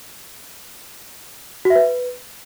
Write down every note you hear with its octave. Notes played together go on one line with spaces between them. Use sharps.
F#4
E5
B4